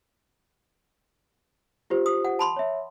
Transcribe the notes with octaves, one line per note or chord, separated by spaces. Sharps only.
F4 G4 C5
D#6
F#5
A5 B5 C6
C#5 E5